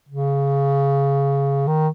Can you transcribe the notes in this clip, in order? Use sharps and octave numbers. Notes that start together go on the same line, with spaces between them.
C#3
D#3